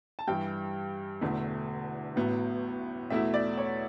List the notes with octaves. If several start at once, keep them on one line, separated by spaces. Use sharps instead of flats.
A5
G2 E3 G3 G5
E1 E2 D3 A3
A1 A2 F#3 B3
E2 B2 A3 E4 E5
D5
C#5